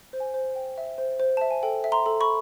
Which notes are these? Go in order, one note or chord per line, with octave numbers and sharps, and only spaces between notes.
C5
G#5
C5
G5
E5
C5
C5
E5 A5
G#5
A4 G5
E5
A#5 C6
A4
B5 C#6